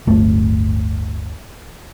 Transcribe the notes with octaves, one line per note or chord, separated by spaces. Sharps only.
D1 G1 A3